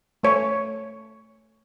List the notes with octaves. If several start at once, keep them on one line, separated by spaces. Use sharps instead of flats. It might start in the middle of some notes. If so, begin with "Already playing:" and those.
A3 C#5